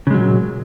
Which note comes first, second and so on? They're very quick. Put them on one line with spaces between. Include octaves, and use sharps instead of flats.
C#3 G#3 F#3 A#2